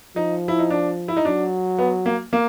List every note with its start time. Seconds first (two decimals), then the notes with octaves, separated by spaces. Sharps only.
0.16 F3 D#4
0.48 E4
0.59 D#4
0.70 D4
1.08 E4
1.17 D#4
1.25 F#3 D4
1.78 B3
2.06 A#3
2.33 A#3